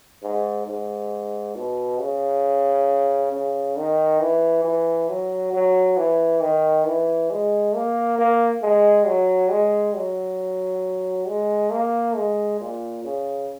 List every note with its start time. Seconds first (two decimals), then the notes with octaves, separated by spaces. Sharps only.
0.23 G#2
0.67 G#2
1.55 B2
2.00 C#3
3.32 C#3
3.77 D#3
4.20 E3
4.64 E3
5.09 F#3
5.53 F#3
5.97 E3
6.42 D#3
6.86 E3
7.31 G#3
7.75 A#3
8.18 A#3
8.62 G#3
9.06 F#3
9.51 G#3
9.95 F#3
11.28 G#3
11.71 A#3
12.16 G#3
12.60 A#2
13.04 C#3